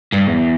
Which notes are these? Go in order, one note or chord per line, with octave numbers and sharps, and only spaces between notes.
G2
E2